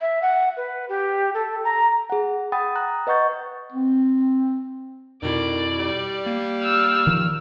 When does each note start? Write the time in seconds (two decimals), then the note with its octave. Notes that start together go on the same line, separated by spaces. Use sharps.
0.01 E5
0.22 F#5
0.57 B4
0.89 G4
1.34 A4
1.64 A#5
2.10 G#4 F#5
2.52 F#5 G5 B5 D#6 A6
2.75 A#5 D#6 F#6
3.07 B4 D#5 F#5 C#6 G6 A6
3.73 C4
5.22 F2 B2 D#3 E4 D5
5.79 G3
6.26 A#3
6.61 E6 F6
7.07 D#3 F3